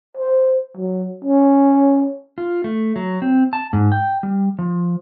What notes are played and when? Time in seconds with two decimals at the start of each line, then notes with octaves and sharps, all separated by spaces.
0.18 C5
0.77 F#3
1.25 C#4
2.38 F4
2.64 A3
2.96 F#3
3.22 C4
3.53 A5
3.73 G#2
3.92 G5
4.23 G3
4.59 F3